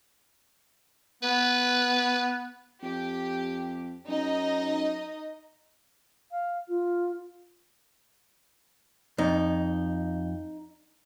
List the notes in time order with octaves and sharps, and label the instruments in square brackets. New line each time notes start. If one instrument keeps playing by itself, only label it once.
[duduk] B3 [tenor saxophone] B4
[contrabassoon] F2 [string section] G4
[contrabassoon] F#2 [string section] D#4 D#5
[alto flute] F5
F4
[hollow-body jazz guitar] F2 [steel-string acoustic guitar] D#4